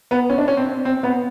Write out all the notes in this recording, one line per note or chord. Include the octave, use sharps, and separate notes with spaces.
B3
C#4
D4
C#4
C4
C4
B3